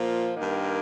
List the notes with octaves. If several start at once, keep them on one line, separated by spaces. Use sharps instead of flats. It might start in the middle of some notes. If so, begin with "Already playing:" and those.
Already playing: A#2 F3
G2 D#3 A#3